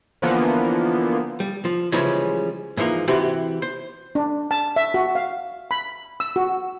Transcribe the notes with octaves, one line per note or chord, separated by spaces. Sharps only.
D3 E3 F3 A#3 B3
G3
F3
C#3 E3 F3 G3 G#3 C#4
G#2 E3 F3 A#3
C3 E3 F#4 G4 B4 C5
C5
D4
A5
E5
F#4
F5
B5
E6
F#4